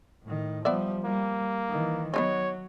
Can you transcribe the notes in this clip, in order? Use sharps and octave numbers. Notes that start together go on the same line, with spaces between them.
A2 D#3
F3 G3 B3 D5 E5
G3 A#3
D#3 E3
F#3 B3 D4 D#4 C#5